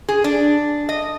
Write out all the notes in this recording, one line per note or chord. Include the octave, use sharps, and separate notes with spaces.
G#4
D4
D#5